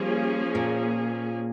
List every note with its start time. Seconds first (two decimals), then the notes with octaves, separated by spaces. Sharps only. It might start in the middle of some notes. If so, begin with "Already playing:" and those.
Already playing: F3 G3 A#3 C#4 G#4
0.55 A#2